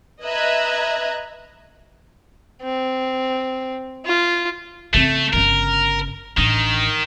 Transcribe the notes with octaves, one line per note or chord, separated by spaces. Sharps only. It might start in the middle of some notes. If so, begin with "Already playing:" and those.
B4 D#5 E5 A#5 F#6 G#6
C4
F4
C#3 A3 C4
G1 C#3 A#4
A1 D#3 D4